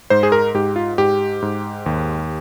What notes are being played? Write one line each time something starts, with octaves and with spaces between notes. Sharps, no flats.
G#2 C5
G#4
A#4
G#2 G4
F4
G#2 G4
G#2
D#2